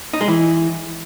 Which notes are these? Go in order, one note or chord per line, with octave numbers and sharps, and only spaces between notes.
D#4
G#3
E3